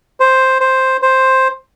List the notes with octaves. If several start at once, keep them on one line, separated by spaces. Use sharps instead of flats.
C5
C5
C5